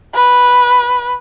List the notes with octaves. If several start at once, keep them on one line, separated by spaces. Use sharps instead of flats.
B4